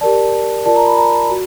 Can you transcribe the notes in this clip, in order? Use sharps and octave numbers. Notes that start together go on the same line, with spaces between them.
G4 A#4 D5 A5
F4 A#4 D5 A5
A#5
B5
A#5
F#4